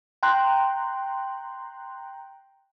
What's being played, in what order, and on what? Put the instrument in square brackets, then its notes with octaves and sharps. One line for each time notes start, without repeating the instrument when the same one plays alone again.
[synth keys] G5 A#5 C6 F#6